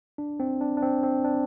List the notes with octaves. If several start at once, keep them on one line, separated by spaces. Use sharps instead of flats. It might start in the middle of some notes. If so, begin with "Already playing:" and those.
D4
C4
D4
D4
C4
C4
D4